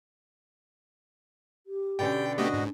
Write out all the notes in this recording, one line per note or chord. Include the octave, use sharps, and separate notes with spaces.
G4
B2 D3 C#4 D5 G5
A3 B3 D4 F#4 G4 D#5
G#2